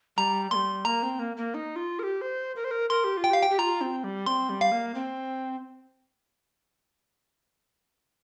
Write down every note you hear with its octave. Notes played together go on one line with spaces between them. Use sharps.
G3 A#5
G3 A#3 C6
A#3 A#5
C4
A#3
A#3
D#4
F4
A#4
G4
C5
A#4
C5
A#4
A#4 C6
G4
F4
G5
G4 F5
G5
G4
F4 A#5
C4
G3
C4 C6
G3
F5
A#3
C4